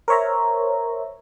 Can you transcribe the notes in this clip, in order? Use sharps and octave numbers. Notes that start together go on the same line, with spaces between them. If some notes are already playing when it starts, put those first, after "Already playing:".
A#4 C5 C#5 E5 A#5